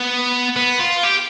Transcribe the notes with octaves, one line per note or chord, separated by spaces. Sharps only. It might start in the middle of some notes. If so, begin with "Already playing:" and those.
Already playing: B3
B3
F4
G4